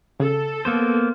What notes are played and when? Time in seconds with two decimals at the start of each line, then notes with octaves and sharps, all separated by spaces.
0.20 C#3 A4
0.65 A#3 B3 C5